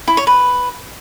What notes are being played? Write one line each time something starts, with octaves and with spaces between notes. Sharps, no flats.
E4
C#5
B4